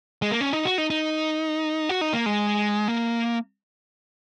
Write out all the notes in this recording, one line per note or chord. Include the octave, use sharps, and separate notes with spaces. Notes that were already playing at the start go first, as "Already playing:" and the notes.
G#3
A#3
C#4
D#4
F#4
D#4
D#4
F#4
D#4
A#3
G#3
A#3